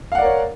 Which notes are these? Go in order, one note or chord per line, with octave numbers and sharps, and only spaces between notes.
A#4 C#5 D5 F5 F#5